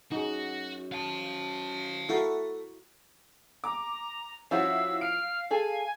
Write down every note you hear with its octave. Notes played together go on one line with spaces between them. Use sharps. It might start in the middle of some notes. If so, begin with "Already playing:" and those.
F#2 D#4 F#4 G#4
F5 A5
A3 E4 F#4 A#4
A#5 D6
F3 C#4 E4 F#4 F5 E6
F6 D7
G#4 A4 G#5